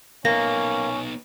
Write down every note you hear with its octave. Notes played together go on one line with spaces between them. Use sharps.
A#3 B3 C#4 D#4 A#6